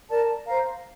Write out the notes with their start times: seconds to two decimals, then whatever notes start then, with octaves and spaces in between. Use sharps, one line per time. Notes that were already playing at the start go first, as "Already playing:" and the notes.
0.10 A#4 D5 A5
0.45 C5 F5 A#5